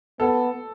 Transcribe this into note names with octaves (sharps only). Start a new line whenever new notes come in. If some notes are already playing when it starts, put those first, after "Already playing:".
B3 A4